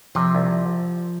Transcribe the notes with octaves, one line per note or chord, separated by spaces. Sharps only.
C3 F3
C2